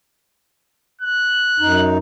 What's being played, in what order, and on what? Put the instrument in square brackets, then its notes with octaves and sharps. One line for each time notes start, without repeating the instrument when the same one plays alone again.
[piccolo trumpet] F#6
[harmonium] F#2 D#4